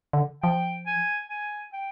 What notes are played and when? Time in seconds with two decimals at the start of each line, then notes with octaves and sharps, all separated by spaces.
0.13 D3
0.43 F3 G5
0.87 G#5
1.29 G#5
1.73 G5